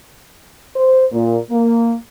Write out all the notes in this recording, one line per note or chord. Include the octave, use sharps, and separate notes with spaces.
C5
A#2
A#3